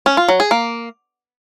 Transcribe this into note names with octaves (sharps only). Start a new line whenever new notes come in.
C#4
F4
F#3
G#4
A#3